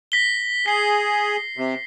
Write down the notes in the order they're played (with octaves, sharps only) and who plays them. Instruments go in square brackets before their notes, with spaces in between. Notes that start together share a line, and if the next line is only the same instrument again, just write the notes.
[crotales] A#6 B6 G7
[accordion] G#4 [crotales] B6 C7
[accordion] C3